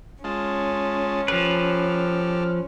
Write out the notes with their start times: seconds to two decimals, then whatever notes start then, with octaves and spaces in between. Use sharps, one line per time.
0.24 G#3 C#4 F4 A5
1.28 F3 G4 A4 B4 F6